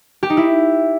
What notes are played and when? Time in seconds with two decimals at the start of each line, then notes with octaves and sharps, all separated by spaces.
0.23 G4
0.30 D#4
0.37 E4